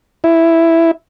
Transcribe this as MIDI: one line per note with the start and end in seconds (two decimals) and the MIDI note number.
0.24 0.91 64